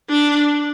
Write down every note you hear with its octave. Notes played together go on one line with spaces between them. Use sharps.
D4